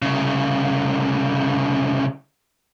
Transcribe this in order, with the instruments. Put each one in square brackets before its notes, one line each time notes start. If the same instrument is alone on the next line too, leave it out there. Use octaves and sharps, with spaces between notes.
[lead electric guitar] C2 C#3